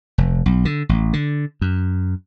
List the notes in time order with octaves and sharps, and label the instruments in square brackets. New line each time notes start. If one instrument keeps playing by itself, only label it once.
[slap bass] F1
B1
D3
A1
D3
F#2